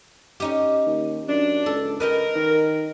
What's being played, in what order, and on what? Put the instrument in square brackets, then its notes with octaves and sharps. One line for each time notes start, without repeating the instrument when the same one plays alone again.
[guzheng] C#4 D#4 G4
[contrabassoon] D#2
[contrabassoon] F#2 [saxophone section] D4
[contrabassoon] C#2 [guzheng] A4
[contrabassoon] C#2 [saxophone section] A#4 [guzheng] B4 D#5 G5
[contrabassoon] D#3